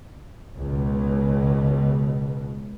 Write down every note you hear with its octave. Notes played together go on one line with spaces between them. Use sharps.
C#2 B2